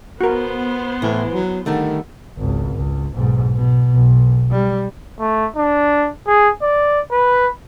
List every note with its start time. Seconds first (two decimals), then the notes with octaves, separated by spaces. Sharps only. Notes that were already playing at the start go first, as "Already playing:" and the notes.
0.21 B3 F#4 A#4 C5
1.02 A2 E3
1.33 F#3
1.66 D3 D#3 G3 A3
2.38 G#1 C#2
2.76 C#2
3.14 B1 G#2
3.56 B2
3.94 B1
4.52 G3
5.19 A3
5.56 D4
6.27 G#4
6.62 D5
7.12 B4